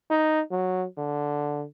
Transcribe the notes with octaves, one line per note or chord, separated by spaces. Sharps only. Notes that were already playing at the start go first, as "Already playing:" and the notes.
D#4
F#3
D3